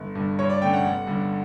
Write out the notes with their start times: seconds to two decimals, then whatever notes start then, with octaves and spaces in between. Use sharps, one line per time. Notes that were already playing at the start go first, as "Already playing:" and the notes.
Already playing: G1
0.15 G2 D3
0.39 G2 C#5
0.50 D5
0.62 D3 A3 C#4 G5
0.73 F#5
0.84 G1
1.07 G2 D3